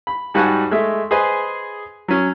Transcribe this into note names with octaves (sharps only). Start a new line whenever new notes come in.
B5
G#2 G3 F#4 F#5 G#5 A5
G#3 A3 E5
G#4 B4 C5 D#5 G#5
F#3 C#4